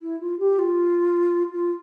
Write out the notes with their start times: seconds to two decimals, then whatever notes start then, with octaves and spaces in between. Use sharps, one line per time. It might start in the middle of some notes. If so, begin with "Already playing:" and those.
0.02 E4
0.20 F4
0.39 G4
0.58 F4
1.53 F4